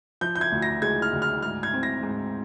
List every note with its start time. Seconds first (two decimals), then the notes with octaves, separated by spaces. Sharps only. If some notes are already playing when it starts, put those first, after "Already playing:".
0.21 F3 G6
0.36 G6
0.41 G#6
0.52 D2
0.62 A#6
0.82 G#3 G#6
1.02 F6
1.13 D2
1.22 F6
1.42 G#2 F6
1.63 G#6
1.73 C4
1.83 A#6
2.03 G#2